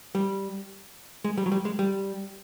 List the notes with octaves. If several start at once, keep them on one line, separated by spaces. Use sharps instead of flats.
G3
G#3
G3
F#3
G3
G#3
G3